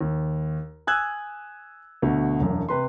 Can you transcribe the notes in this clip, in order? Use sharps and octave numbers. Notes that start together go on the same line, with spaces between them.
D#2
G#5 D#6 E6 F#6 G#6
D2 B2
E1 F#2
C3 B4 C6